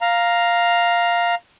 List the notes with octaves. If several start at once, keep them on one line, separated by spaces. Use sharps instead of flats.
F5 A#5